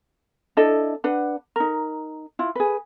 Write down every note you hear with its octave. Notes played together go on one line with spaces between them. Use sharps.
D4 E4 A4 D#5
D4 B4 F#5
D#4 A#4
E4 F4
G#4 B4